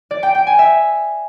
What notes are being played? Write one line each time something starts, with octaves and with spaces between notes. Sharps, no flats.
D5
G5
G5
G#5
E5